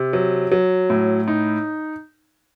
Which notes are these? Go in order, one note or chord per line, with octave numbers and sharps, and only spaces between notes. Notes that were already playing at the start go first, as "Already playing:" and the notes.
Already playing: C3
F#3
F#3
A2
D#4